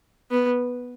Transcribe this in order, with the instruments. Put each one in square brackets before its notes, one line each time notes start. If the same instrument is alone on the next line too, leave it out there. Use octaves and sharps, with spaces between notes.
[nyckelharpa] B3